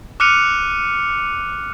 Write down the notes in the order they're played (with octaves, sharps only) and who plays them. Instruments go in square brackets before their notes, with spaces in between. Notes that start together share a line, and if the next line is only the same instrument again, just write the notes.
[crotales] D6 F6 F#6 C#7 D#7 F7